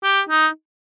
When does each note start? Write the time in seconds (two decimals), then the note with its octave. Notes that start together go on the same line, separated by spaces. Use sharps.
0.03 G4
0.29 D#4